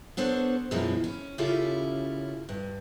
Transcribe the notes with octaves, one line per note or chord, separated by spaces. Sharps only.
B3 D4 A4 C5 C#5
F#2 B2 E3 F3 G#3
C#4
C#3 C#4 E4 F4 G4 A4
G2